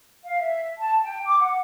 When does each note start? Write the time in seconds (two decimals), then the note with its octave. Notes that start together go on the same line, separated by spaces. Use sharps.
0.23 F5
0.40 E5
0.79 A5
1.02 G5
1.25 D6
1.40 F#5